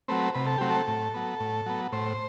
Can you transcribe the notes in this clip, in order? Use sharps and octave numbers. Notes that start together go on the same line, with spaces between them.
F#3 A3 C4 B4
C3 B4
A4
F#3 A3 C4 G4
A4
A2
F#3 B3
A2
F#3 B3
A2 C5